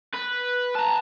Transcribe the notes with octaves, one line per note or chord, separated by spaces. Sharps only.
B4
A5 A#5